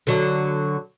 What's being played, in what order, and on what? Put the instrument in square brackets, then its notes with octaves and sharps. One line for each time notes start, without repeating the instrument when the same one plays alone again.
[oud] D3 F#3